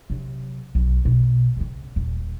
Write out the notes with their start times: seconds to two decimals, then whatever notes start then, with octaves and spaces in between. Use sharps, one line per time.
0.10 C3 F#3
0.75 B1
1.05 B2
1.57 C#3 C4
1.96 D#1